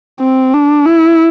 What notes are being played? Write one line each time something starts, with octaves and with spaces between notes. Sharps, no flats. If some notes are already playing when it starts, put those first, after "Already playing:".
C4
D4
E4